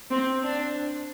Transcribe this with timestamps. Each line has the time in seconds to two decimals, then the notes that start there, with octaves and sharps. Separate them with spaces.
0.11 C4
0.43 D4